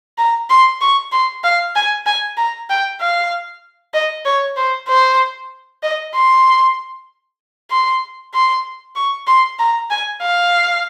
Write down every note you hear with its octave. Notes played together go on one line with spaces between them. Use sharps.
A#5
C6
C#6
C6
F5
G#5
G#5
A#5
G5
F5
D#5
C#5
C5
C5
D#5
C6
C6
C6
C#6
C6
A#5
G#5
F5